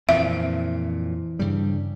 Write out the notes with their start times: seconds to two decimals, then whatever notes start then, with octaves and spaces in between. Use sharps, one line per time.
0.09 F2 A#2 E3 C4 E5
1.39 G2 C#3 G3